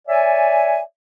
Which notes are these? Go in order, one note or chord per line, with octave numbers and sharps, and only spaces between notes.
C#5 D5 E5 G#5